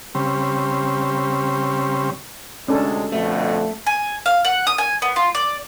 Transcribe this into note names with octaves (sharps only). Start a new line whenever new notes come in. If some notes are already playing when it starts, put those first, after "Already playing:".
C#3 G3 C4
D2 C3 G#3 C#4 D4 A4
F2 B2 D3 A3
G#5
F5
F#5
D#6
G#5
B3
F4
D5